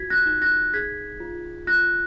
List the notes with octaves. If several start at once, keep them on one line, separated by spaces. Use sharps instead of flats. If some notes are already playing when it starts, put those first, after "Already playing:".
Already playing: F4 F#4 G#6 B6
F#6 A#6
D#4
F#6 A#6
G#4 G#6 B6
F4
F4 F#6 A#6